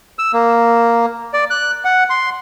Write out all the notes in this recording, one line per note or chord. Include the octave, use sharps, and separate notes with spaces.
E6
A#3
D5
F#6
F#5
C6